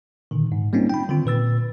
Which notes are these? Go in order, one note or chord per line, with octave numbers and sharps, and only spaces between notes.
A#2 D3 D#3
G#2
G3 A#3 C4 C#4 D#4 F4
G5 B5
D3 D#3 C4 F4
A#2 B4 E6 A6